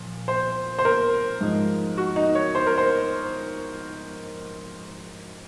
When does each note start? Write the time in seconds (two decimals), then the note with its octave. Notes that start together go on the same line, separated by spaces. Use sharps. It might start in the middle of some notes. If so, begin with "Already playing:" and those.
Already playing: A#2 F3
0.28 C5
0.79 C5
0.85 A#4
1.41 G#2 F3 G#3
1.98 F#4
2.16 D#4
2.35 C#5
2.55 C5
2.67 A#4
2.78 C5